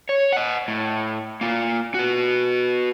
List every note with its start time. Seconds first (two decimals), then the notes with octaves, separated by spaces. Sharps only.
0.09 C#5
0.32 D#5 F#5
0.68 A2
1.41 A#3 F4
1.94 B3 F#4